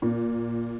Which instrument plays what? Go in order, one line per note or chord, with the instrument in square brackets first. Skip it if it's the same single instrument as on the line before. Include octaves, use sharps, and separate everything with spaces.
[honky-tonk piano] A#2